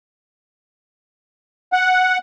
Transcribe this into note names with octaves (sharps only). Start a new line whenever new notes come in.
F#5